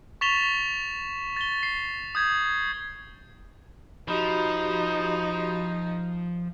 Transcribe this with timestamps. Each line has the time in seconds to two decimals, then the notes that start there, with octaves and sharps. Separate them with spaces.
0.21 C#6 A6 B6 E7 F7 G7
1.37 A6 G7
1.63 C7
2.15 D#6 G6 G#6
4.08 F3 D#4 F#4 G4 B5